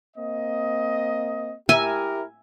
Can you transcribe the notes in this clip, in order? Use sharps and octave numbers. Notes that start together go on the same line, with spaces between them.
A#3 C4 D#5
E4 G4 A#4 E5 G#5